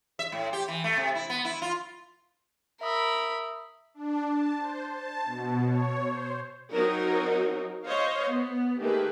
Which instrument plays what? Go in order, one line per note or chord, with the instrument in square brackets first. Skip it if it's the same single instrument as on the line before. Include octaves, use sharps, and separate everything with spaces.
[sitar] E5
A2
G4
E3
A3
C3
E4
B3
E4
F4
[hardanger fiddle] A#4 B5 [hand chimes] E5 D#6 E6
[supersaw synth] D4
A5
C5
A5
B2
C#5
C5
[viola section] F#3 C4 D#4 A#4 C#5
C5 C#5 D#5 F5
B3
D#3 A3 A#3 G4 G#4 B4